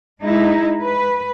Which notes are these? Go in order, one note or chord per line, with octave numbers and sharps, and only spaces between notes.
G#3 D#4 E4
B4